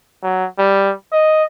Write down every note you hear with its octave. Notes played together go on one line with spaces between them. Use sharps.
F#3
G3
D#5